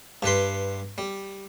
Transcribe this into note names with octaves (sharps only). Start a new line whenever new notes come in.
G2 G3 B4 C6
G3